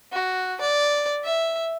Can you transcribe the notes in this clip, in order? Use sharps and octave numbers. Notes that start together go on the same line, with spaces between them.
F#4
D5
E5